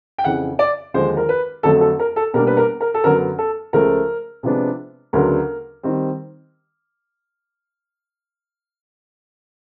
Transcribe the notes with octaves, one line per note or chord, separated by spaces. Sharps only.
G5
F2 C#3 E3 F#5
D5
D#2 D3 F3 G#3 C5
A#4
B4
F2 D3 F#3 A3 A4
A4
A#4
A4
B2 G3 A#3 D4 A#4
B4
A#4
A#4
A4
F#2 D3 F#3 B3 A#4
A4
C#2 C#3 F3 A3 A#4
C3 F3 G#3 B3 D4
D2 C#3 F#3 B3 D4 A#4
D#3 G3 C4